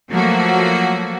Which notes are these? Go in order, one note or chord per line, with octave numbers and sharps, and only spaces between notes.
F3 F#3 A3 A#3 F#4